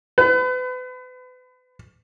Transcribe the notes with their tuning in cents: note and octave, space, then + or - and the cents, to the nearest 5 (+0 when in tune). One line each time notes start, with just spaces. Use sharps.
B4 +35